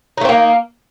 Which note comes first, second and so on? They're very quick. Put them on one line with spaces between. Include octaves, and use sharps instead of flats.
D#4 A3 C4 A#3